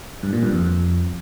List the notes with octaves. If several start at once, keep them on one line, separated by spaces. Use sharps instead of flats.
G2
A#2
G2
F2